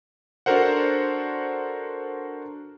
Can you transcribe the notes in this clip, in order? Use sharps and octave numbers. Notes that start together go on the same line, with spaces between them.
D4 F#4 A4 A#4 C5 F#5